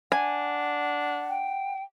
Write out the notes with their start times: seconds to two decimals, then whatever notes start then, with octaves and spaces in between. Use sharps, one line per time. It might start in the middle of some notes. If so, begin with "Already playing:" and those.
0.12 D4 F#5 G#5
1.29 G5